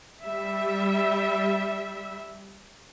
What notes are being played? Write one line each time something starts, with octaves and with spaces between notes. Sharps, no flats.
G3 E5